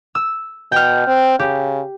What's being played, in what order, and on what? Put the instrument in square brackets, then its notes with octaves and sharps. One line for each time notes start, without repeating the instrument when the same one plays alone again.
[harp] E6
[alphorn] B2 [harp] G5 F6
[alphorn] C4
[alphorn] C#3 [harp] G4